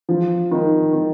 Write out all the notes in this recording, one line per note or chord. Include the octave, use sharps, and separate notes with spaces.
F3
D#3
D#3